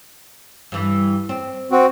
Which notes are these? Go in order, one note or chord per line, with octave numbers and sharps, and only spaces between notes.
G2 E3
C4
C4 F#4